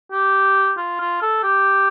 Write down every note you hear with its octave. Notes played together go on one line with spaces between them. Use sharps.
G4
F4
F4
A4
G4